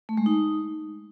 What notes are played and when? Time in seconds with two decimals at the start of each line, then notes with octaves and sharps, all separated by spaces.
0.09 A3
0.17 G#3
0.26 D#4